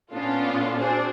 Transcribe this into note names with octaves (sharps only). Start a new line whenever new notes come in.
A#2 B3 C#4 D4 F4 A4
C4 D4 F#4 G#4 C5